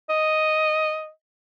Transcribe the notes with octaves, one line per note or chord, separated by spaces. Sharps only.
D#5